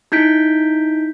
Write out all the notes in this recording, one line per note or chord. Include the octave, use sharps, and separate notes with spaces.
D#4 E4 G6 B6 D7